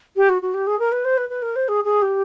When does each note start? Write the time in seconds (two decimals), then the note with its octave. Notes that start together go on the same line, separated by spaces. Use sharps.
0.16 G4
0.29 F#4
0.42 F#4
0.54 G4
0.67 G#4
0.79 A#4
0.92 B4
1.05 C5
1.17 B4
1.29 B4
1.42 A#4
1.56 C5
1.68 G#4
1.84 G#4
2.02 G4